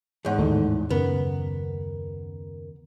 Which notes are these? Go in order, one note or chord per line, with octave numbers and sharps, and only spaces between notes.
E2 G#2 G#4 C#5 F#5
D#2 A2 D#4 A4
F#2 C#3 B3 A#4